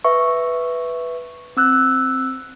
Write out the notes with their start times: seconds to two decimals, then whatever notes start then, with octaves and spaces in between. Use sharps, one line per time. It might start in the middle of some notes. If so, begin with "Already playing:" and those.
0.04 B4 E5 C#6
1.57 C4 E6 F#6